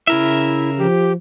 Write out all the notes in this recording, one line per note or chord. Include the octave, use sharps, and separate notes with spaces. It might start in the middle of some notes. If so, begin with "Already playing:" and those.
C#3 E4 A#4 E5
F3 G4